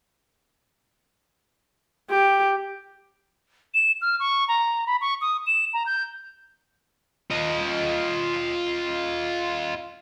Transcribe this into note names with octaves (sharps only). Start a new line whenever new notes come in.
G4
E7
F6
C#6
A#5
B5
C#6
D#6
E7
A#5
G6
F4 D#5